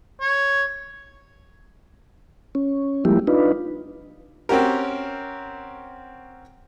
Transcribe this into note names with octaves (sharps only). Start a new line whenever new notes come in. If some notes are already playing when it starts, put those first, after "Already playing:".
C#5
C#4
F3 G3 G#3 A#3 E4 G4
D4 D#4 F4 B4
C4 C#4 F#4 G4 A#4